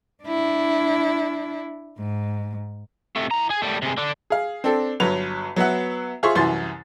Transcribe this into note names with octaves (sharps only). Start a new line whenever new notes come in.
D4 E4
G#2
C3 A3
E3 A#5
G#4
A2 G3
C3 G#3
D3 D4
G#4 F5
C4 D4 A4
G1 F#3 B4 F7
F#3 B3 E5 F#5
F4 G#4 C5 E5 C6 C#6
C2 F#2 E3 C6 A6